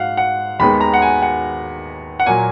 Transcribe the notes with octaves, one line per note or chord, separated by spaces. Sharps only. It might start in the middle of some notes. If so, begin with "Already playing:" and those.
Already playing: G#2 F5 F#5
F#5
D#2 D#3 G#3 B3 B5
A#5
F#5
G#5
F#5
F#5
A#2 F#3 A#3 G#5